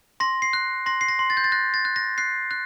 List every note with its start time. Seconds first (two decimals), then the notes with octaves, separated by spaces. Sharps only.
0.20 C6 A#6
0.42 C7
0.53 F#6
0.86 C6 A#6
1.01 C7
1.09 A#6
1.19 C6
1.30 A6
1.37 G6
1.44 A6
1.52 F#6 A#6
1.74 A6
1.85 F#6
1.96 A#6
2.18 F#6 C7
2.51 F#6